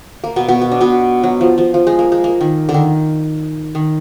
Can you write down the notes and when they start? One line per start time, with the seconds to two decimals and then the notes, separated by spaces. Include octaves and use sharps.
0.24 A#3
0.36 B2 B3
0.49 B2 B3
0.61 B3
0.71 D4
0.81 B2 B3
1.23 F#3
1.41 F3
1.58 F3
1.74 F3
1.87 G#3
1.99 A#3
2.12 G#3
2.24 A#3
2.41 D#3
2.69 D3
2.74 D#3
3.75 D#3